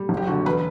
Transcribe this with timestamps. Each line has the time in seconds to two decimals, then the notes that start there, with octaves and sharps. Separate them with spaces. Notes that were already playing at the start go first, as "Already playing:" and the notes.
Already playing: G3
0.09 F#1
0.17 G4
0.27 D3 F#4
0.45 E1 B4